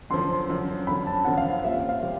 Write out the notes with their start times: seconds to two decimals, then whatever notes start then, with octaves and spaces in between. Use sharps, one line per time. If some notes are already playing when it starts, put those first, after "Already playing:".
0.10 F#2 D3 F3 C6
0.49 F#2 D3 F3
0.87 F#2 D3 F3 B5
1.07 A5
1.25 F#2 D3 F3 F#5
1.37 F5
1.63 A#2 G3 C4 F4 E5
1.89 F5
2.02 A#2 G3 C4